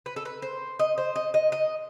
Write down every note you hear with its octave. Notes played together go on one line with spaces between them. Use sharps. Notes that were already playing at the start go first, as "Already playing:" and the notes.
B4
A4
B4
C5
D#5
C5
D#5
D#5
D#5